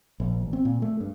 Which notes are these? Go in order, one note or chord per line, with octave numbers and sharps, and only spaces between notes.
A#1
A1
C4
A#2
A3
G2